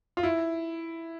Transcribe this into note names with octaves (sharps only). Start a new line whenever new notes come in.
F4
E4